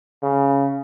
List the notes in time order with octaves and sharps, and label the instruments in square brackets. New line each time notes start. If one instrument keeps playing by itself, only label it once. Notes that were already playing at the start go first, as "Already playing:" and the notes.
[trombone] C#3